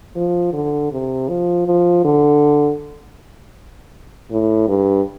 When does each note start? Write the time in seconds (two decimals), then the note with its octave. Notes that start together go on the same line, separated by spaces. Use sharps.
0.15 F3
0.53 D3
0.91 C3
1.29 F3
1.66 F3
2.05 D3
4.31 A2
4.68 G2